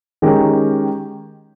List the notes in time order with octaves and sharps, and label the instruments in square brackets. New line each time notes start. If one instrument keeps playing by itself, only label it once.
[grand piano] D#3 G#3 C#4 G4 A#4